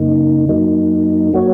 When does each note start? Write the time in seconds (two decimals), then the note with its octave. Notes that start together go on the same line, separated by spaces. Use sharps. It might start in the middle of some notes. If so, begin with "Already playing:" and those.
Already playing: F#2 C#3 A#3 D#4
0.49 F#2 F#3 A#3 D#4
1.33 F#3 A#3 F#4 C#5